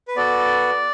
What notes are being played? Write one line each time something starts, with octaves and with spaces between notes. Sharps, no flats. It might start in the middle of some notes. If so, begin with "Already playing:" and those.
B4
B3 F#4 A4 D5